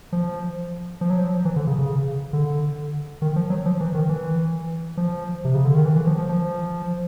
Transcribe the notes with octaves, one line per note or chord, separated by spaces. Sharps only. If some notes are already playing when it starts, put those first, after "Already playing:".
F3
F3
F#3
F3
E3
D3
C#3
C#3
D3
D#3
F3
F#3
F3
E3
D#3
E3
F3
C3
C#3
D3
D#3
E3
E3
F3
F3
F3